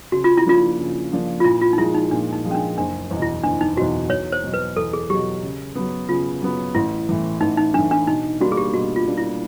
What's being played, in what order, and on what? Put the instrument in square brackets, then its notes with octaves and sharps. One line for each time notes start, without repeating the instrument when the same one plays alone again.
[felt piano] C#3 [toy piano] F#4
[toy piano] F4
E4
[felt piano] F3 A#3 D4 [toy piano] F4
[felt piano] C#3
F3 A#3 D4
[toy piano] F4
[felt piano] A#2 [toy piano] E4
[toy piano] F4
D#4
[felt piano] F3 G#3 [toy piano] E4
[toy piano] D#4
[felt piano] A#2 [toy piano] D4
[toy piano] D#4
[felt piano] F3 G#3
[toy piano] C#4
D4
[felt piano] F#1 [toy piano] D4
[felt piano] E2 B2
[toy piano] E4
[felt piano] F#1 [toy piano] D4
[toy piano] D#4
[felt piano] B2 [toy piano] F#4
[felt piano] E2
[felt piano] E2 [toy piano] C#5
[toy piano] C5
[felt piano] B2 F#3
[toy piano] B4
[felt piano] E2 [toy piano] A4
[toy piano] G#4
[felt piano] F#3 [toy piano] G4
[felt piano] B2
C#3
F#3 B3
[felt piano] C#3 [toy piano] F4
[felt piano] F#3 B3
[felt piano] A1 [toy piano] E4
[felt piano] A2 E3
[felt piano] A1 [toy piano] D#4
[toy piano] D#4
[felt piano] A2 E3 [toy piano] D4
[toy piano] D4
[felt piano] B2 [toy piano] D#4
[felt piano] G3 A#3 D4 [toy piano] F#4
[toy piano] G#4
G4
[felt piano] B2 [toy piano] F#4
[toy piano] F4
[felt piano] G3 A#3 D4
[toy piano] E4